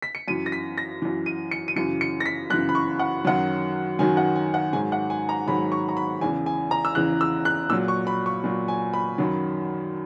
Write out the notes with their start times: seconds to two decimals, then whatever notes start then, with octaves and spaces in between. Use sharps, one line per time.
0.02 B6
0.15 C#7
0.28 F#2 E3 D#7
0.46 A#6
0.52 B6
0.78 A#6
1.02 F#2 E3
1.26 D#7
1.51 C#7
1.68 D#7
1.76 F#2 C#3 E3 C#7
2.01 C#7
2.20 A#6
2.26 B6
2.50 F#2 C#3 E3 F#6
2.69 B5
2.75 C#6
2.99 F#5
3.25 F#2 D#3 F#3 F#5
3.99 F#2 D#3 F#3 G#5
4.17 F#5
4.36 G#5
4.54 F#5
4.73 G#2 D#3 F#3 G#5
4.92 F#5
5.10 G#5
5.29 A#5
5.47 G#2 D#3 F#3 B5
5.72 C#6
5.89 A#5
5.97 B5
6.21 E2 C#3 E3 G#5
6.46 G#5
6.71 A#5
6.85 E6
6.95 E2 C#3 E3 F#6
7.21 E6
7.45 F#6
7.70 A#2 F#3 E6
7.88 C#6
8.07 B5
8.26 C#6
8.44 A#2 F#3
8.68 G#5
8.94 B5
9.18 F#2 D#3 F#3